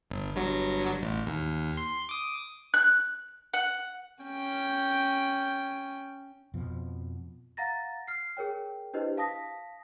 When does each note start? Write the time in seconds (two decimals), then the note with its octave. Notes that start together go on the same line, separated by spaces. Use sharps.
0.10 G1
0.36 G1 G2 F#3
1.03 A1
1.27 D#2
1.77 C6
2.09 D6 D#6
2.74 F#6
3.54 F#5
4.24 C#4 G5
6.54 F2 B2 F3
7.57 F5 F#5 A#5 A6 A#6
8.07 F6 C7
8.37 G#4 A#4 C#5 G5
8.94 D4 E4 G4 B4 C5 D#5
9.17 F5 A5 D#6 A#6 B6